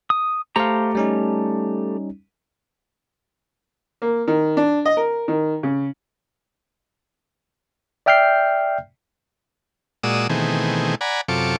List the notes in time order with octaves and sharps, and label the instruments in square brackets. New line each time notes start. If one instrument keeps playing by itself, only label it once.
[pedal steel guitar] D#6
[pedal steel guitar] A3 G4 A#5 [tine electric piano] C5 F5
[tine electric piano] G3 C#4 D#4
[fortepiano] A#3
D#3
D4
D#5
A#4
D#3
C#3
[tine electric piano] D5 E5 G5 F6 G6 C7
[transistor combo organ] A#2 G#3 F#4 D5 D#6 E6
B2 D#3 E3 A3 C4 G#4
D5 F#5 G#5 A#5 B5
F#2 C3 F4 A4 C#6 D6